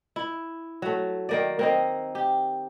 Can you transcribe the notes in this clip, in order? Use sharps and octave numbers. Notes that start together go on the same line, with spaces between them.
E4
F#3 A3
D#3 A#3 D5
A#3 C4 D#4
G4